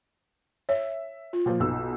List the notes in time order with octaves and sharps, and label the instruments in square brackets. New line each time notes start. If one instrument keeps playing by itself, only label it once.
[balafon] C#5 [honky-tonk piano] E5
[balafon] F4
[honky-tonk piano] A#2 F3
B1 B2 E6